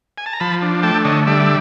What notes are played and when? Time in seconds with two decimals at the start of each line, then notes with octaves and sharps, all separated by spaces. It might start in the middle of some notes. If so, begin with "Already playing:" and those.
0.18 G#5
0.26 A5
0.33 A#5
0.40 F3 A5 B5
0.62 D4
0.83 A3 G5 A5
1.05 D3 C#5 D#5
1.27 G3 D5 E5